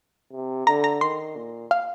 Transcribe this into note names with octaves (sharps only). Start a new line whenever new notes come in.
C3
D3 A#5
A#5
D#3 C6
A#2
F5